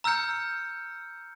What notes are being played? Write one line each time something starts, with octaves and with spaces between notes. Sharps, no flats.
A#5 E6 F6 G6 C#7